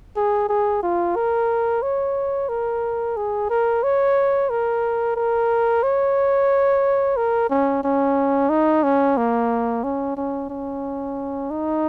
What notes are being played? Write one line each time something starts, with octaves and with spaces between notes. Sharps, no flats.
G#4
G#4
F4
A#4
C#5
A#4
G#4
A#4
C#5
A#4
A#4
C#5
A#4
C#4
C#4
D#4
C#4
A#3
C#4
C#4
C#4
D#4